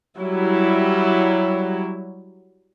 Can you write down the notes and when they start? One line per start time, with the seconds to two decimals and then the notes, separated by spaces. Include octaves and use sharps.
0.18 F#3 G3 E4